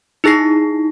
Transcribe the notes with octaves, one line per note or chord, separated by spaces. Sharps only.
D#4 E4 G#4 A#6 C7